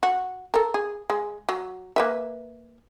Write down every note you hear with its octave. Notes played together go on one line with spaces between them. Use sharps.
F#4
A4 A#4
G#4
G#3
F#3
A#3 B4 E5